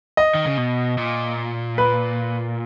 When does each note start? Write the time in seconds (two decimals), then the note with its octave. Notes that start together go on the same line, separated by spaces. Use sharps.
0.17 D#5
0.35 D#3
0.46 C#3
0.58 B2
0.98 A#2
1.78 B4